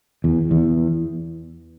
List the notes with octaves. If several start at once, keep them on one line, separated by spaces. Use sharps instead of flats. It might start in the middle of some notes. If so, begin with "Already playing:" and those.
E2
E2